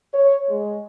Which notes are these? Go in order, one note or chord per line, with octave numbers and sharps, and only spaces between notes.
C#5
G#3